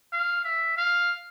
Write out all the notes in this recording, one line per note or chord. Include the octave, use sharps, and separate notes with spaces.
F5
E5
F5